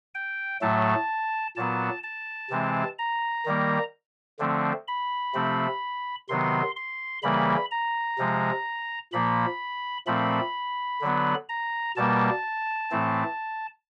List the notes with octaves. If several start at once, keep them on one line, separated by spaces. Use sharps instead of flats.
G5
A2 F#3 A3 A5
A#2 F#3 B3 A5
A5
C3 E3 G#3 C4
A#5
D#3 G3 A#3
D3 F3 A3 C4
B5
C3 F3 A3 C4
C3 D#3 F#3 B3 C6
C6
C#3 E3 G3 A#3 B5
A#5
C3 F3 G#3
A#2 F3 A#3 B5
A#2 F3 A3 C4 B5
D3 F#3 B3
A#5
B2 G3 A#3 A5
A2 E3 A3 C4